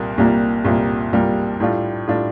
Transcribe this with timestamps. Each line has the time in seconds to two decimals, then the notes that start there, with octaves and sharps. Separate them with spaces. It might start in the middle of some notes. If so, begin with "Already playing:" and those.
Already playing: C2 A#2 G3 A#3
0.18 C2 A#2 G3 A#3
0.64 C2 A#2 G3 A#3
1.13 C2 A#2 G3 A#3
1.60 A2 G3 D4 F4
2.07 A2 G3 D4 F4